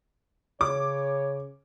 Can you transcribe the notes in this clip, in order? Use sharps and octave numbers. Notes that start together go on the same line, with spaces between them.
C#3 C#5 D6